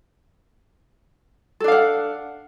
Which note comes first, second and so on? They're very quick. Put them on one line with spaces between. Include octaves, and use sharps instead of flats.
A4 D4 F5 F#5